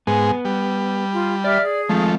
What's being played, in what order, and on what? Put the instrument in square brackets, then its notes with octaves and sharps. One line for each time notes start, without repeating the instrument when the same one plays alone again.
[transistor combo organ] G#2 G#3 [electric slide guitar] B3
[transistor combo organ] G3
[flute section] F4
[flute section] G4 E5 F6 [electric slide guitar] D5
[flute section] G#4
[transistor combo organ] F3 A3 [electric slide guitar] G#3 C4